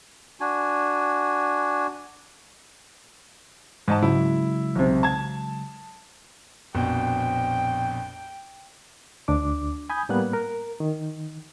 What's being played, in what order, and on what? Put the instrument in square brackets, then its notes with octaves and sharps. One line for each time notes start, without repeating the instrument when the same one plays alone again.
[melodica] D4 F#4 G#5
[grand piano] G#2 D#5 A5
[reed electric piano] C#3 F#3 G#3 [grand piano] E4
[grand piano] B1 C3
A5 G#6
[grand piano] A#1 F2 B2 [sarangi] G5
[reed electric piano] D2 D4 D6
G#5 B5 D#6 G6 G#6
A2 G3 A#3 B3 F#6
A#4
D#3